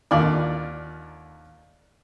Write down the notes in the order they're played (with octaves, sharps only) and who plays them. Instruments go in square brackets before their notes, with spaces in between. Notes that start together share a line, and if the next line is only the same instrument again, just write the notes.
[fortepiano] D#2 A#2 D3 D5